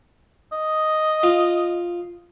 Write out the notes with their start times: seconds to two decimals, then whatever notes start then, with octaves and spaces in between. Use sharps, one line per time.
0.52 D#5
1.23 F4